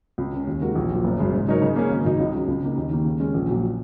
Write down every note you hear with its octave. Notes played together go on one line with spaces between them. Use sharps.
C#2
C#3 G#3 C#4
D#2
D#3 G#3 F#4 A#4
A#1
A#2 F#3
F#1
F#2 C#3 G#3
G#2
F#3 D#4 A#4 C#5
C#3
A#3 C#4 G#4
G#1
F#2 C#3 F#3 D#4
C#2
C#3 F#3
C#2
C#3 A#3 D#4
D#2
D#3 A#3
C#3
G#3 C#4
A#1
A#2 F#3